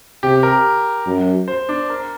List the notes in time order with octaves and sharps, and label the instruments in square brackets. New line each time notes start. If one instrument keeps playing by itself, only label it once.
[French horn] C3 [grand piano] G4
[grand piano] A#4
[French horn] F#2
[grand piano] C5
D4
A#4